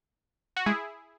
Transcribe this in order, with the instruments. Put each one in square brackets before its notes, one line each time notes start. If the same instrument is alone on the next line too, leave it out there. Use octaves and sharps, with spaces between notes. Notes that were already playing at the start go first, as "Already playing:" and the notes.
[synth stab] F#4
[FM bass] G#3 [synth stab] E4 G#4